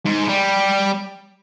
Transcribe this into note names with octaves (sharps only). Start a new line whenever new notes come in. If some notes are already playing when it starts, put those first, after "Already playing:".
G#2
G#3
G3